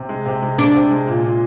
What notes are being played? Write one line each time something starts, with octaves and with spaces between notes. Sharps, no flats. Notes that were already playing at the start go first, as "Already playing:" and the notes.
Already playing: C3
G#3
C3
G#3
C3 D4
C3
G#3
A#2
A#2